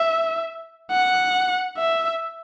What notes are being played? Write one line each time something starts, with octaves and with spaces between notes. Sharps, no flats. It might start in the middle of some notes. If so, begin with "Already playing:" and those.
Already playing: E5
F#5
E5